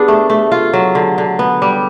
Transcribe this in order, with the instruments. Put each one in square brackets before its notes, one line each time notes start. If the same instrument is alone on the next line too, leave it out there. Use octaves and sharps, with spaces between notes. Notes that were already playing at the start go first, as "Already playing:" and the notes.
Already playing: [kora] B3 D4 [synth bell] G4 G#4
[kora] A3
A3
F4
F#3
D3
D3
B3
G3